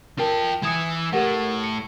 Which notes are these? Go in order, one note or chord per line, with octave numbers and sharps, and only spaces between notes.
F4 A#4 G5 A5
E3 E4 G#5 D#6 C#7
A2 G4 A#4 F#5
C#7